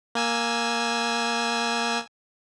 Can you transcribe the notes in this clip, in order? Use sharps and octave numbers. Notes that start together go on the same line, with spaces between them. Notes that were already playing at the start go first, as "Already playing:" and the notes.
A#3 G#5 E6